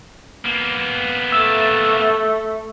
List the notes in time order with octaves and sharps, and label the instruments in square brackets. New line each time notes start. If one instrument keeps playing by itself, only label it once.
[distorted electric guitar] A#3 B3
[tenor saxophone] A3 [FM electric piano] E5 E6 A6